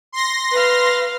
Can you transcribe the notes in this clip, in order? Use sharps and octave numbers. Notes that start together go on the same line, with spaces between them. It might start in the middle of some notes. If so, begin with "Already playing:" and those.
C6 A#6
B4 F5